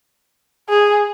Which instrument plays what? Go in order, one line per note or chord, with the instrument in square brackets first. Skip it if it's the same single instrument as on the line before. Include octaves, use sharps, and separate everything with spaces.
[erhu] G#4